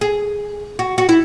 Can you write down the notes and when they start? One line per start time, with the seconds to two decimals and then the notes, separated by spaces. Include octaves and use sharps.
0.01 G#4
0.79 F#4
0.98 F#4
1.09 E4